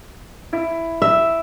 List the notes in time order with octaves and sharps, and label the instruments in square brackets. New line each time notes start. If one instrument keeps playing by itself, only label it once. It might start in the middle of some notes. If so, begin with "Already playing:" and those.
[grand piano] E4
[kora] E5